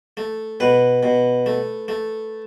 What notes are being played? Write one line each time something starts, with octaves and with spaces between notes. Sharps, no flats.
A3
B2 B4
B2
A3
A3